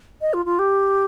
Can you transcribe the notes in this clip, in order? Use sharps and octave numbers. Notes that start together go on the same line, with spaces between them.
D#5
F4
F4
G4